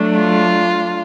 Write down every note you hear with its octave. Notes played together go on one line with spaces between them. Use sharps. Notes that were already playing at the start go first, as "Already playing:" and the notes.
Already playing: F#3 A3 D4
F4